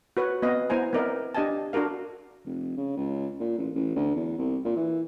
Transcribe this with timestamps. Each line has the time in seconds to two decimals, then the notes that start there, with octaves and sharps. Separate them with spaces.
0.17 F#4 B4 C#5
0.43 B3 C4 D#5 F5
0.70 B3 E4 C5 G#5 A#5
0.93 B3 C4 D#4 A#4 D5 E5
1.35 D4 G4 D#5 F5 G#5 A5
1.73 D4 F#4 A4 A#4 F5
2.46 F1
2.77 C#3
2.97 C#2
3.40 A#2
3.58 A1
3.75 A1
3.96 D2
4.16 E2
4.38 C2
4.65 A#2
4.76 E3